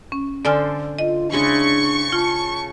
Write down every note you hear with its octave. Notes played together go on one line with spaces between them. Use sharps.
C#4
D3 A4 C5 D5 G#5 F6
F4 D#5
C#3 G#3 D4 E4 C#6
F4 A5